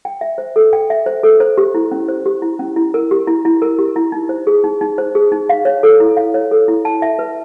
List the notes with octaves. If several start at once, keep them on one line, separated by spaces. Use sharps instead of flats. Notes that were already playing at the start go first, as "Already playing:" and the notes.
G5
E5
C5
A4
G5
E5
C5
A4
C5
G4
E4
C#4
C5
G4
E4
C#4
E4
A#4
G4
E4
E4
A#4
G4
E4
D#4
C5
G#4
D#4
D#4
C5
G#4
D#4
F5
C#5
A4
E4
F5
C#5
A4
E4
A5
E5
B4